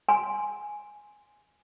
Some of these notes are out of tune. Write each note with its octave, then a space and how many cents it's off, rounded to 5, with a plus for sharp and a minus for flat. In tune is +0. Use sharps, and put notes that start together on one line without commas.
G#5 +0 C6 +0